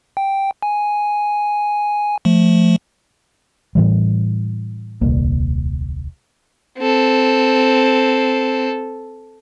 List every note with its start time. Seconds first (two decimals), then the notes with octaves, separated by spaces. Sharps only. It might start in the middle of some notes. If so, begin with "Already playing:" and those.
0.17 G5
0.62 G#5
2.25 F3 A3
3.75 A2 E3 G3
5.01 D#1 C2 A#3
6.78 C4 A4